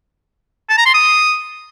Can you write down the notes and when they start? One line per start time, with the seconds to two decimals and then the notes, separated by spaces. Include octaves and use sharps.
0.69 A5
0.77 A#5
0.85 C6
0.94 D#6